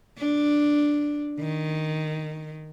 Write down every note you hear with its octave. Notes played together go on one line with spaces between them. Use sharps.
D4
D#3